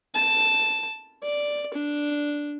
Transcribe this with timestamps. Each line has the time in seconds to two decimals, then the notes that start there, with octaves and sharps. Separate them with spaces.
0.15 A5
1.23 D5
1.74 D4